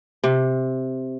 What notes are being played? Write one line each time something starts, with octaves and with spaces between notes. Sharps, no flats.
C3